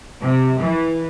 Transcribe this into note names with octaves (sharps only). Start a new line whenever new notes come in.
C3
E3